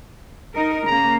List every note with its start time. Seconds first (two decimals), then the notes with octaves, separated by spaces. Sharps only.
0.55 D#4 A#4
0.87 C#3 A#3 A#5